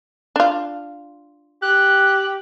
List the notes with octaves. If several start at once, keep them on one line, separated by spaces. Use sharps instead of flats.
D4 F4
G4 F#6